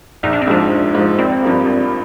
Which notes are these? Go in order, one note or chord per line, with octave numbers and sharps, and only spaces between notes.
A#1 D#4
D4
C4
G#2 F3 D4
A#1
G#2 F3
G#1 C4
G2 F3 A#3
G#1